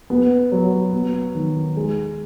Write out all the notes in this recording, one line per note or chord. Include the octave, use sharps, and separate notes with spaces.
B3
F#3
B3
D#3
G#3